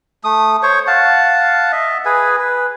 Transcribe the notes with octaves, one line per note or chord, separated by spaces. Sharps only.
A3 D#6
C5 C#5 C#6
F5 F#5 A5
D#5 E5
G#4 B4 G#5
B4